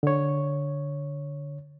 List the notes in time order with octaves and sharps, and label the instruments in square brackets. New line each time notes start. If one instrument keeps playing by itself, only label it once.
[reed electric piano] D3 C#5